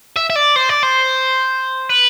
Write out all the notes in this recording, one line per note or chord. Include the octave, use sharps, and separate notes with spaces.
E5
E5
D5
C5
D5
C5
B4